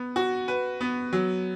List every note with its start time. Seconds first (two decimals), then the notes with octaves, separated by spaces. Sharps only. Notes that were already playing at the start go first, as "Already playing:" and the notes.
Already playing: B3
0.16 F#4
0.48 B4
0.81 B3
1.13 F#3